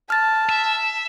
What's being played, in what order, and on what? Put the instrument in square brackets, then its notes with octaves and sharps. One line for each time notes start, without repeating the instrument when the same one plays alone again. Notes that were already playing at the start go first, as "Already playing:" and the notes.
[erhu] A5 [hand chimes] F6 A6
[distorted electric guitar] E5